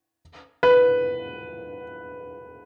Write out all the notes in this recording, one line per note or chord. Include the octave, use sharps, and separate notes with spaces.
B4